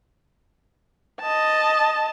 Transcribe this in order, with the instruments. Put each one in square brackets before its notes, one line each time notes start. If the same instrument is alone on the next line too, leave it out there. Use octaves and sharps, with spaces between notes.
[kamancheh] D#5 A5